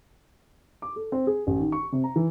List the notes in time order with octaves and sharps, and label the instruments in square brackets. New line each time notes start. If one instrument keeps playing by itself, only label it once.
[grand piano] D6
A4
C4
G#4
A1
D#3
C#6
C3
A#5
E3